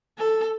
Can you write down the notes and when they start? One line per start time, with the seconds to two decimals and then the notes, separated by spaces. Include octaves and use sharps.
0.18 A4